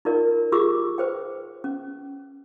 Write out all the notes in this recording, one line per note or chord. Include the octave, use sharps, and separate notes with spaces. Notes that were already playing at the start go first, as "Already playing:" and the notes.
D#4 F4 A#4 D5
F4 G4 G#4 C#6 D6 E6
B4 C5 G5
C#4